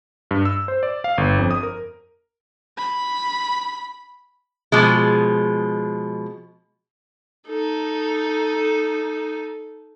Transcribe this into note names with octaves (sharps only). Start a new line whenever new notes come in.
G2
E6
C5
D5
F5
G1
F2
D#6
A#4
B5
B2 F3 G#3
D#4 A4